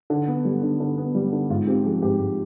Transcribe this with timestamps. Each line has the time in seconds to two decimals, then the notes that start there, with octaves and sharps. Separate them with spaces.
0.10 D3
0.28 B3
0.45 G3
0.63 D3
0.80 D3
0.98 B3
1.15 G3
1.33 D3
1.50 G#2 F4
1.67 C4 G4
1.84 F3 G#4
2.02 G#2 G4
2.20 G#2